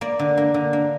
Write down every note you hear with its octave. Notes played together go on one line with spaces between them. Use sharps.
A#3 D5
D3
A#3
D3
A#3